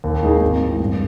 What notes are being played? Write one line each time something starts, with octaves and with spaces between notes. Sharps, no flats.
D#2
D#3 G#3 D#4 G#4
G#1
G#2 E3
G2